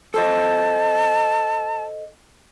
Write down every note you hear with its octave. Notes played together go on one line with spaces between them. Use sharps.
A4 C5 D#5 A5